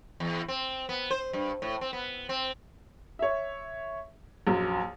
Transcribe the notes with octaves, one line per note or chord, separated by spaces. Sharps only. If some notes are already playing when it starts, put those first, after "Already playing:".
E2
C4
B3
C5
G2
A2
C4
B3
C4
C#5 E5
A#1 F#2